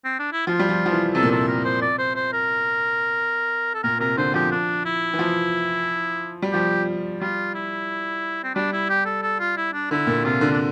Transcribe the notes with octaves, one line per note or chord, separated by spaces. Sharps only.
C4
D4
E4
F3 F4
G3
F3
F3
E3
C3 A4
A#2
C3 A4
A#4
C5
D5
C5
C5
A#4
A4
A#2 A#4
C3 A#4
D3 C5
F3 G4
D4
E4
E3
F3
G3
F3 G4
G3 F4
E4
C4
G3 D4
E4
G4
A4
A4
F4
E4
D4
D3 E4
A#2
C3 F4
D3
D4